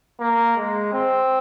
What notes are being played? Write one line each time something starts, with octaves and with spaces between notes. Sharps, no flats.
A#3
G#3
C4